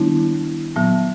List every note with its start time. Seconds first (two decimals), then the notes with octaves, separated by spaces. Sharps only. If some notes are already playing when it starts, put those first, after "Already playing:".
Already playing: D#3 G3 B3 D4 E4
0.76 A#2 F#3 B3